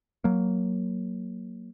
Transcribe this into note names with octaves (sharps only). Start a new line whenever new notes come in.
F#3 A#3